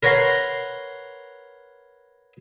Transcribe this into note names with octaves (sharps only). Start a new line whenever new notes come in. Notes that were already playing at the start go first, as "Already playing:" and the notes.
A#4 B4 C#5 F#5 A#5 C6